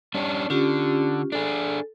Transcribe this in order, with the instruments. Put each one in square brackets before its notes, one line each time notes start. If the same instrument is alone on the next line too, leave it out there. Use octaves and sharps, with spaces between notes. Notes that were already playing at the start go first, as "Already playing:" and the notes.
[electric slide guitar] G3 C#4 D4
[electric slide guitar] D3 [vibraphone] C#4 F4 G4
[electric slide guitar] D4 G#4 [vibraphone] A4